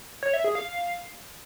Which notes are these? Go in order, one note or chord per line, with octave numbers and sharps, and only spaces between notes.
C#5
E5
G#4
F5